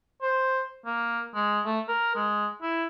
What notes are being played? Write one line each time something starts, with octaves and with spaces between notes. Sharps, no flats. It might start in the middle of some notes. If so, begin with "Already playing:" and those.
C5
A#3
G#3
A3
A#4
G#3
E4